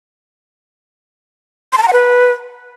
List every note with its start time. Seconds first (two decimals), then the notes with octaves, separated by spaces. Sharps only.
1.73 C6
1.78 A5
1.83 A#5
1.88 F#5
1.93 B4